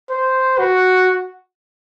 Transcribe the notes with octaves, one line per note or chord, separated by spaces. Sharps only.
C5
F#4